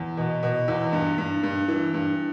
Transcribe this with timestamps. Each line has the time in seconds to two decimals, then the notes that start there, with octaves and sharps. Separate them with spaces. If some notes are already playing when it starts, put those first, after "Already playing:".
Already playing: E2
0.17 B2
0.43 B2
0.68 E2
0.93 G2
1.18 G2
1.43 G2
1.68 E3
1.94 G2